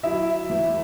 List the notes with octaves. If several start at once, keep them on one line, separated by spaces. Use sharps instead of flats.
F#3 E4 E5
E2